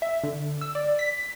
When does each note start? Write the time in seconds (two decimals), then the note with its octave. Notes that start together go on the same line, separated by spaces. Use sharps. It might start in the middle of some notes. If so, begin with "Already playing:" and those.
0.02 E5
0.23 D3
0.61 E6
0.75 D5
0.99 B6